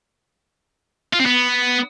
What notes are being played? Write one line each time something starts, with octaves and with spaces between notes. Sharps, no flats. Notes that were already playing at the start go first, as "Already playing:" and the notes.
F4
C4
B3